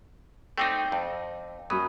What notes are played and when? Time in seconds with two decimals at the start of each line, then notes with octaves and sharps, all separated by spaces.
0.58 A3 C4 D#4 G5 D6
0.92 F2
1.70 F#2 F#3 B5 D#6